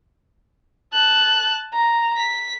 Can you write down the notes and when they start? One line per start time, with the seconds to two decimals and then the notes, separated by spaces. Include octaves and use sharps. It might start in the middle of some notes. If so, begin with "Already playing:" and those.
0.94 A5 F#6
1.74 A#5
2.17 B6